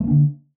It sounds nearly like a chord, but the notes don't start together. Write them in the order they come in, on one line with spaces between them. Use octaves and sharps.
A3 A#3 D4 D3